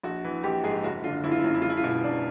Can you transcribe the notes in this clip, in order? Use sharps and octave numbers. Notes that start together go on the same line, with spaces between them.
A#1 F#4
E3
A#1 G4
G#2 G#4
F#1 F#4
D3 F4
F#1 E4
F4
E4
F#2 F4
E4
E1 F4
E4
F4
B2 E4
E1 D4